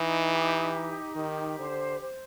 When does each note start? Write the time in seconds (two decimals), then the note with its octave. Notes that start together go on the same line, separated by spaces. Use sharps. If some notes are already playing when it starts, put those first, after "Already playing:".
Already playing: E3 D#4
0.30 G4
0.73 D#4
1.16 D#3 G4
1.59 D3 C5
2.01 C5